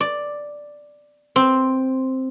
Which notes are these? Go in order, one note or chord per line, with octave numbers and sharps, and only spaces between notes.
D5
C4